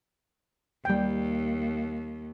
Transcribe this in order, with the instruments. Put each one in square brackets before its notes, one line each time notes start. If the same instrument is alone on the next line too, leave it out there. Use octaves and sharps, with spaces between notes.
[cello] D#2 [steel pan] G3 G5